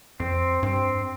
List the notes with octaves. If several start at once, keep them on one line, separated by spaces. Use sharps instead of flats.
F2 C4
G2 C4